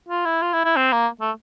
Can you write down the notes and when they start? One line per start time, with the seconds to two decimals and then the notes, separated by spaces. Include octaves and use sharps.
0.09 F4
0.25 E4
0.42 F4
0.53 E4
0.64 E4
0.76 C4
0.92 A#3
1.21 A3